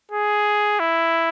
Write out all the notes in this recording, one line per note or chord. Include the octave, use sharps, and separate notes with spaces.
G#4
E4